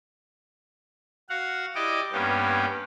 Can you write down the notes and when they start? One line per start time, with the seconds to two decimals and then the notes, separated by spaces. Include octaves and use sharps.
1.29 F#4 F5 F#5
1.75 E4 G4 D5 D#5 D6
2.12 G2 A#3 B3 C#4 G4